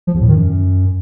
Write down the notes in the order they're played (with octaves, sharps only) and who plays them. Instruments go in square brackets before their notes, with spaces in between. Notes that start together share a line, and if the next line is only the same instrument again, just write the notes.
[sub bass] F3
E2
A2
D#3
F#2